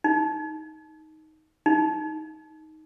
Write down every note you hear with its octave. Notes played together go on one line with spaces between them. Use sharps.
D#4
D#4